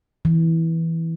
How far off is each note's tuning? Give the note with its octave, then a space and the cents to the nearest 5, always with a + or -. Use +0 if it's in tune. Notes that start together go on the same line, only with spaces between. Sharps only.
E3 -10